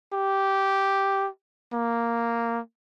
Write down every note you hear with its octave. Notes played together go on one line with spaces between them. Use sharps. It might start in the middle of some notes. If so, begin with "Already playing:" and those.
G4
A#3